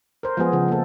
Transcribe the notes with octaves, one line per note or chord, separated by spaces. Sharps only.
A#4 C5
F3 G#3 B3 G#4 C5
C#3 F3
A#3 A4